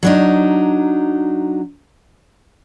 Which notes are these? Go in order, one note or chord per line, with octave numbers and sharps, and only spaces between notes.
F#3 D4 D#4